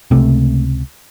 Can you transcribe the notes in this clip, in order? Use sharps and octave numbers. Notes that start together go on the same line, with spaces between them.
C#2 C3 A3